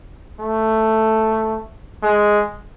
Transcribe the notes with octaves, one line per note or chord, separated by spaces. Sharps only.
A3
G#3